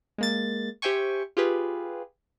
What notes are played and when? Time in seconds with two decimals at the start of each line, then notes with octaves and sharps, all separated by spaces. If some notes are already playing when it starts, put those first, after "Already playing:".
0.18 G#3 A#3 A6
0.82 G4 C5 E5 G5 G#5 C#6
1.37 F4 G4 G#4 B4